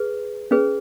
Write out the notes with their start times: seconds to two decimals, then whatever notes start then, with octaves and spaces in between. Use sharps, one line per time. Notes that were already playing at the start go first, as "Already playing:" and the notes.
Already playing: G#4 B4
0.51 C#4 G#4 B4